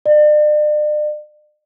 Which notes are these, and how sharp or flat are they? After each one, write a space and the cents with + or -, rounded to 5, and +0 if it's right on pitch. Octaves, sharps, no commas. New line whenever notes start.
D5 +40